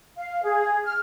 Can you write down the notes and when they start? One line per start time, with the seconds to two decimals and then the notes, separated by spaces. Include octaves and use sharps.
0.17 F5
0.43 G#4
0.86 F6